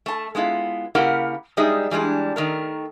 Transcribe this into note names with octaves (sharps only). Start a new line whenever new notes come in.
A3 A5
G#3 B3 E4 F4
C#3 A#3 E4 G4 A#4 F#5
G3 G#3 D#4 G#4 E5
E3 G3 G#3 D4
D#3 A3 A#4